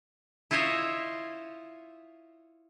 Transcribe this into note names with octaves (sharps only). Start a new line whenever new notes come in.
E4 F4 C5 C#5 D#5 E5